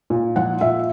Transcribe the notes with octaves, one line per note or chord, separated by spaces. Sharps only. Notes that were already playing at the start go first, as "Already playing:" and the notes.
A#2
F3 F#5
A#2 E5